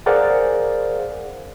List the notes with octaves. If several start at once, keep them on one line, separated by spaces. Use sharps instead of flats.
G#4 A#4 C5 D5 F5 F#5